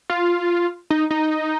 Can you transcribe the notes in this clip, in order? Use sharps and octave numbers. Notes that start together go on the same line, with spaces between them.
F4
D#4
D#4